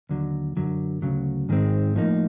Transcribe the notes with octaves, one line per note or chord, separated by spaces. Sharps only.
D#2 D3 F#3
F#2 D3 F#3
D2 C#3 F#3
G#2 D#3 G#3 C4
A2 F3 A#3 D#4